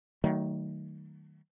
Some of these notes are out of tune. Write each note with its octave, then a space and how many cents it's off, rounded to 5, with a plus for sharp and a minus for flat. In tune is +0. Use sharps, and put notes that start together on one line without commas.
D#3 +0 F#3 +40 A3 +20